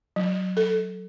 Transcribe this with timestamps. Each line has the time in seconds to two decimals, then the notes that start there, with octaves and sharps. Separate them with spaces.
0.16 F#3
0.57 A4